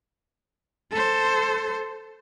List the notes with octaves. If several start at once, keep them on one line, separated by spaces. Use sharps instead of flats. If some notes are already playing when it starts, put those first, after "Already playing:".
A4 C5